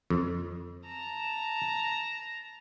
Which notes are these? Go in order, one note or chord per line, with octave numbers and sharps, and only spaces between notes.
F2
A5 A#5